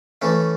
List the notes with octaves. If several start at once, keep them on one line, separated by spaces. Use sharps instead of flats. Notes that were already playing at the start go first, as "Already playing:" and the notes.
E3 A3 C#4